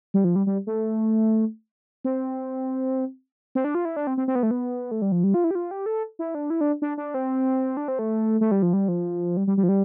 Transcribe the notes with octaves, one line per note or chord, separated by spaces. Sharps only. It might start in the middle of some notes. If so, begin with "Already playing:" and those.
G3
F3
G3
G3
A3
C4
C4
D4
F4
E4
D4
C4
C4
C4
B3
A3
B3
A3
G3
F3
G3
F4
E4
G4
F4
G4
A4
E4
D4
E4
D4
D4
D4
C4
D4
C4
A3
A3
G3
F3
G3
F3
G3
G3
G3
F3
G3